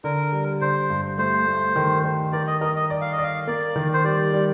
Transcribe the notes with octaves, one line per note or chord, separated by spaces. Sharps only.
D3 A#4
G3
D3 C5
G2
A3 C5
A3
D#3
D#3
A#4 D5
D#5
A#4 D#5
D#5
D5
F5
D#5
D5 F5
A#3 D5
D#3
C5
G3 D5
G3